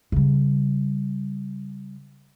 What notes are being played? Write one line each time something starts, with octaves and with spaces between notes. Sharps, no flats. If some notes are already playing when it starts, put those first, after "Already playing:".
C#3 G3